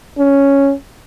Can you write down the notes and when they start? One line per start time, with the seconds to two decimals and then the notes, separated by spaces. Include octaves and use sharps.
0.18 C#4